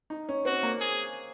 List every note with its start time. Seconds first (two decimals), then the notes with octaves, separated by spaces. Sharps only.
0.10 D#4
0.29 C#4
0.45 C4 F#4
0.63 A#3
0.81 G#4